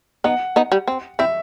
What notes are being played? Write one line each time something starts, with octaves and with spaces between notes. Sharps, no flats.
B3 D#4 F#5
B3 D#4
G3
C4
C4 E4 E5